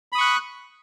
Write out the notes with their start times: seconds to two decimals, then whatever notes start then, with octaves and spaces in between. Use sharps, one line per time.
0.12 B5
0.15 D#6
0.18 C#6
0.21 F#6